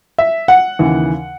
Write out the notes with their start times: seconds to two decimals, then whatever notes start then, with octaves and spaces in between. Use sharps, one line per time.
0.18 E5
0.48 F#5
0.79 D#2 C#3 E3